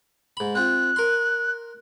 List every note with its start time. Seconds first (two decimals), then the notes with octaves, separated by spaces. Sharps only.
0.37 G#2 B5
0.55 C4 F4 F#6
0.96 A#4 C6